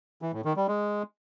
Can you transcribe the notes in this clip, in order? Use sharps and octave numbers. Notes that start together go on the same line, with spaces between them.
E3
A2
D#3
G3
G#3